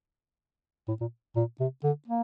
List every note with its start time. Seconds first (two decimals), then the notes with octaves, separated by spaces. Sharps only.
0.88 A2
1.01 A#2
1.36 A#2
1.60 C3
1.84 D3
2.08 A#3